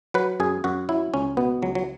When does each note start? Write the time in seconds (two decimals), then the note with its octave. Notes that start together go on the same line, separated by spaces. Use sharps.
0.14 F#3 B4
0.40 F#2 G#4
0.64 F#2 F#4
0.89 F#3 E4
1.14 C#2 C#4
1.37 B2 B3
1.62 C#2 F#3
1.75 F#3